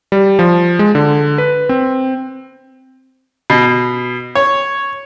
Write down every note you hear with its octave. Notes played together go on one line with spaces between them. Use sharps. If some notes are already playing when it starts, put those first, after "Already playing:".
G3
F3
G#3
D3
B4
C4
B2
C#5